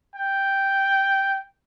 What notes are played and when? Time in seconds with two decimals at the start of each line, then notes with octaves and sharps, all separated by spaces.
0.15 G5